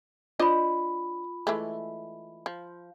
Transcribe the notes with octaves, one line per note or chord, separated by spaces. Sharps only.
D4 F4 C5 D#5 B5
E3 G#3 A3
F3